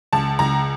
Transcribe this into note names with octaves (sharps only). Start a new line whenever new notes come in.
C#2 A5
C#2 A#5